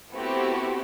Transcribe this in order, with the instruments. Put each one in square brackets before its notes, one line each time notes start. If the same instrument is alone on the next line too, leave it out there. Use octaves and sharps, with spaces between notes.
[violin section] A3 B3 C4 E4 F#4 G4